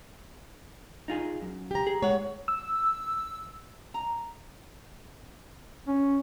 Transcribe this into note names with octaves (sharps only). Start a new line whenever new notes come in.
D#4 F4 G#4
F#2
G4 A#5
G#4
G#3 C#5 F#5
E6
A#5
C#4